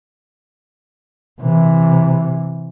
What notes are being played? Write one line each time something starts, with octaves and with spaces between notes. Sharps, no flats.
C3 E3